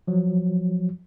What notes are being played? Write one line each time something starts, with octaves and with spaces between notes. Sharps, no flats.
F3 F#3